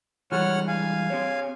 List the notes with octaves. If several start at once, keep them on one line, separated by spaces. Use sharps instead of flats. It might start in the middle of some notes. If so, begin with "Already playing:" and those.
E3 G3 G#3 C#5 F#5 F6
F5 G#5
C4 G4 C#5